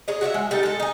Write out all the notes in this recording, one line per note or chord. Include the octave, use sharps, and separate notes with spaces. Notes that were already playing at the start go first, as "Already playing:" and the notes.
G#4 C#5 D#5
F#4 C#5 D5 E5
G#3
G3 D#4 A4
G#3 A4
D#4 G#5